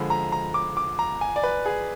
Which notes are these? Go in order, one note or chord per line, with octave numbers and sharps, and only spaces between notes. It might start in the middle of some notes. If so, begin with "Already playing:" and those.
Already playing: D3 F3 G#3 B5
A#5
A#5
D6
D6
A#5
G#5
D5
B4
G#4